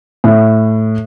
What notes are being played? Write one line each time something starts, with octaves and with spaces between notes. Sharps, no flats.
A2